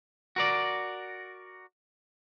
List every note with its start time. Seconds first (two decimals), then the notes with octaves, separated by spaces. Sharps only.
0.36 F#4 A#4 D5